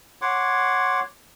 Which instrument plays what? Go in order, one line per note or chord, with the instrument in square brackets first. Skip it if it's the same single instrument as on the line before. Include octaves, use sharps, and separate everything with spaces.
[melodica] C#5 F#5 C6 D6